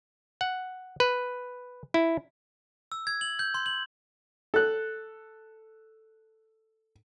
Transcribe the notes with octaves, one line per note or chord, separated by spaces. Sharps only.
F#5
B4
E4
E6
G#6
F#7
G6
C6
F#7
A4 F#6